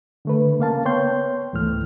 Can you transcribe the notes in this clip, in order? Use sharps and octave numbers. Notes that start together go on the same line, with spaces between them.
D3 A3 B4
C#3 A#3 F5 A5
B3 C#5 G5 C6 G6
C#2 G#2 E3 A3 F6